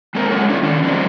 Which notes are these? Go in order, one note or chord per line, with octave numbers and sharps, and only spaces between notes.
G#3 C4 A4 A#4 C5
F#3 G#3 C#4 F#4 C#5
D4 F4 A4
D#3 C#4 D4
F3 F#3 G#3 C4